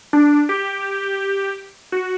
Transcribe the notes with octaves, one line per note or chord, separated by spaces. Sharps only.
D4
G4
F#4